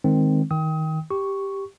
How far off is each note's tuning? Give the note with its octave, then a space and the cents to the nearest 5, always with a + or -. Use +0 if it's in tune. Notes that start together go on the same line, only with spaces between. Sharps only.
D#3 +0 G#3 +0 C4 +0
D#3 +20 G5 +0 D#6 +30
G4 +0 C#6 +0